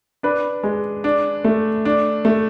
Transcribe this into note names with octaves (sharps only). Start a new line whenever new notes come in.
D4 B4
G#3
D4
A3
D4
A3